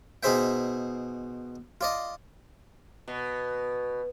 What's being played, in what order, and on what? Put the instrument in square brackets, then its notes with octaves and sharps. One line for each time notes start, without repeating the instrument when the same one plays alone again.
[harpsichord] B2 D#4 G#4 C5 E5 G5
F4 D5 D#5
[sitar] B2